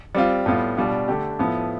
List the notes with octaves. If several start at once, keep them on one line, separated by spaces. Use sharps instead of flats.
G3 C4 F4
A2 G3 B3 F4
B2 G3 D4 F4
D3 A3 D4 G4
A2 F3 B3 E4